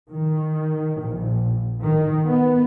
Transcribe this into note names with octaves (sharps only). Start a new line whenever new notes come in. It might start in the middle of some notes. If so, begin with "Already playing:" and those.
D#3
A#1
D#3
B3